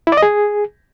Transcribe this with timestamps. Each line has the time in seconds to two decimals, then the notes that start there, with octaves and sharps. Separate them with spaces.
0.07 E4
0.12 D5
0.17 D#5
0.22 G#4